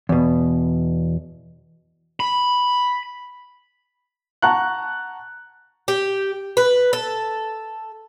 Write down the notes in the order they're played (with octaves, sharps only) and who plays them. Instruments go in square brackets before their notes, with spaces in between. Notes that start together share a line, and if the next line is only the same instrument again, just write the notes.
[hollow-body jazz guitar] E2 B2
[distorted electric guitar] B5
[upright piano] F#5 A5 A#5 C#6 F#6
[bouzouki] G4
B4
A4